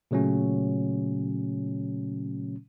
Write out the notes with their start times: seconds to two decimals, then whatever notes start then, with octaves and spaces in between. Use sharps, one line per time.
0.11 A#2 C#3 F#3 A3 C#4